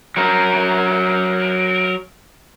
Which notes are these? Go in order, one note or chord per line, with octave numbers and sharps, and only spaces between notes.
F#3 A#4